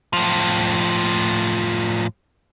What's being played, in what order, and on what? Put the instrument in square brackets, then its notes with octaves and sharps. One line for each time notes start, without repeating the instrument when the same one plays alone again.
[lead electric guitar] A2 F3